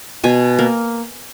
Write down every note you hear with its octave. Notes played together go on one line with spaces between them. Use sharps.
B2 G#5
A#3